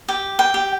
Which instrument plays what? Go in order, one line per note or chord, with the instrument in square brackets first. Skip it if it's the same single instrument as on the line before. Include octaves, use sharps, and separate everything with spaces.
[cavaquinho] G4
G5
G4